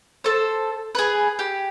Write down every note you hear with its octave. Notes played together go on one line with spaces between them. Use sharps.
A4 C5
G#4 B4
G4